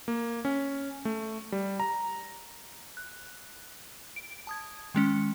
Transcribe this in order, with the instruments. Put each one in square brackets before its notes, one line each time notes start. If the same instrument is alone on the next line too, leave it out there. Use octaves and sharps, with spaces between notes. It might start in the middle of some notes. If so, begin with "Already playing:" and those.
[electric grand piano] A#3
C#4
A3
G3
A#5
[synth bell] F#6
D7
A5 D#6 G#6
D#3 G#3 C#4 C#7